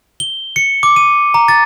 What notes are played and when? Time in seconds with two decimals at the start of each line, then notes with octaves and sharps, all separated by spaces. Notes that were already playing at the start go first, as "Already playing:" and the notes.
0.20 G7
0.56 C#7
0.83 D6
0.96 D#7
1.34 A#5
1.48 A6